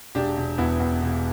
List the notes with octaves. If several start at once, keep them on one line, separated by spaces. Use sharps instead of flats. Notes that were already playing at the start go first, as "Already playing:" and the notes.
E1 D4 G4
E1
E2 B3 E4
E2
E1